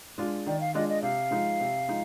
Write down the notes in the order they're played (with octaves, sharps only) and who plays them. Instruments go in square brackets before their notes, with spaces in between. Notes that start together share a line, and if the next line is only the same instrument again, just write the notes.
[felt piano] G#3 D4 F4
[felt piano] D#3 [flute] D5
[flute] F5
[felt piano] G#3 D4 F4 [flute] D#5
[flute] D#5
[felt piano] C3 [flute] F5
[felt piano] F3 G#3 D#4
C3
F3 G#3 D#4